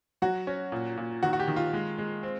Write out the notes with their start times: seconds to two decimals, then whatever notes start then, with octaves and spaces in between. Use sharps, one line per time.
0.22 F#3 F#4
0.47 C#4
0.72 A#2
0.97 A#2
1.23 D#3 F#4
1.33 F#4
1.40 G4
1.48 D#3
1.56 F4
1.73 G#3
1.98 G#3
2.23 C4